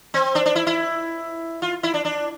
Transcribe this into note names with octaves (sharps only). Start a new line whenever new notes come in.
C4
D4
D4
E4
E4
F4
E4
D4
D4